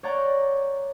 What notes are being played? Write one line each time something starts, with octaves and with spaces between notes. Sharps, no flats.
C#5 D5 F#5 A#5 G6